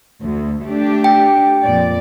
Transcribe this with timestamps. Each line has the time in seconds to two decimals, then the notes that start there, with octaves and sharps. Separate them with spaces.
0.22 D2
0.65 A3 D4 G4
1.04 G5
1.62 F2 A#2 D5